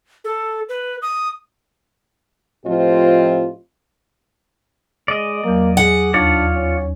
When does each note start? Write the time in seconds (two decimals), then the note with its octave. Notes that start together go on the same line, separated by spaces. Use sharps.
0.24 A4
0.69 B4
1.02 D#6
2.65 A2 F3 C4 F4 G4 D#5
5.08 G#3 D5 D#5
5.44 E2 F#3 A#3
5.77 G#4 F#5
6.14 D#2 D4 F4 C#5 D5 F6
6.53 C#4